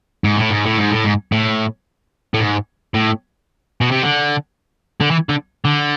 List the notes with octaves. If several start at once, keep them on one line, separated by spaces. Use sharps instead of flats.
G#2
A2
G#2
A2
G#2
A2
G#2
A2
A2
G#2
A2
B2
C3
D3
D3
E3
D3
D3